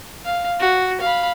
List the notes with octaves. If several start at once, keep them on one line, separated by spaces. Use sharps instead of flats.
F5
F#4
F5 B5